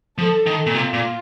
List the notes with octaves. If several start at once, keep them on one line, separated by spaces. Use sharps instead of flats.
F3 A4
D#3
A#2
C3 F4
A#2